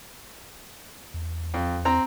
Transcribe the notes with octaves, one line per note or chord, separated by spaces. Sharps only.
E2
F2
C4 A#5